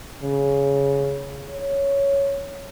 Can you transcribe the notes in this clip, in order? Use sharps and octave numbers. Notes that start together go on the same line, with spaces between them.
C#3
C#5